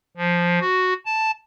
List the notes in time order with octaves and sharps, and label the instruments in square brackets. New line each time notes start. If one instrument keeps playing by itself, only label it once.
[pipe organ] F3
F#4
A5